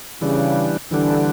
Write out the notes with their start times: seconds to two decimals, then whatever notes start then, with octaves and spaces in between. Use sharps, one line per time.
0.21 C#3 E3 G3 D4
0.91 D3 E3 G3 D4